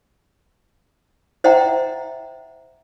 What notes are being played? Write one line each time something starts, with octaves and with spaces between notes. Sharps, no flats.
C5 D#5 E5 F#5 G5 A#5